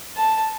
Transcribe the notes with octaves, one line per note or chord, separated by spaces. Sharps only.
A5